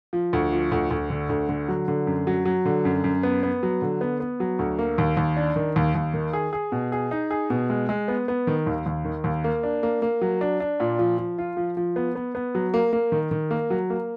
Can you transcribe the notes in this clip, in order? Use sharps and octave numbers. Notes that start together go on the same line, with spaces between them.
F3
D2
F3
D2
D2
D3
D2
D3
F#3
D3
F#2
F#3
F#3
D3
F#2
F#2
B3
B3
F#3
D3
B3
B3
F#3
D2
A#3
D#2
D#2
D4
D#3
D#2
D#2
D#3
G#4
G#4
B2
G#4
D#4
G#4
B2
G#3
G#3
B3
B3
D#3
D#2
D#2
D#3
D#2
A#3
D4
A#3
A#3
F#3
D4
D4
A#2
F3
F3
F4
F3
F3
B3
B3
B3
F#3
A#3
A#3
D#3
D#3
A#3
F#3
A#3